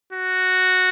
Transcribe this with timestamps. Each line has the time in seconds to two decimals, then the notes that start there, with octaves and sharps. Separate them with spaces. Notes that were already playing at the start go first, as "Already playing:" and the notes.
0.13 F#4